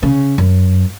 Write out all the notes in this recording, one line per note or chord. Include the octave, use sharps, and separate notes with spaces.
C#3
F#2